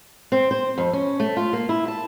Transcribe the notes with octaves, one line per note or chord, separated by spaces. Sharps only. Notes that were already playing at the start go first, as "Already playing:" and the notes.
C4
C5
F2
C#4
A3
F4
A#3
E4
A5